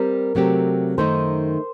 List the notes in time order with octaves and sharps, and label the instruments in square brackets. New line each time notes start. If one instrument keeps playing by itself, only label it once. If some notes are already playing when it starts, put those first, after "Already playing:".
Already playing: [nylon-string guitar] G3 C4 G4 [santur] A#4
[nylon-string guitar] C3 F#3 A3 C4 G4
[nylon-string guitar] F#2 D#3 A3 D#4 [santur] C5